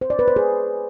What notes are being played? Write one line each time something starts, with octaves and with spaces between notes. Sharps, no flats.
C5
D5
B4
C5
G#4